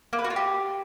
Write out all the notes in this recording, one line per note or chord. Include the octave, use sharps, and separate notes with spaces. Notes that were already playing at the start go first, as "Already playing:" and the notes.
A#3
B4
F#4
F4
G4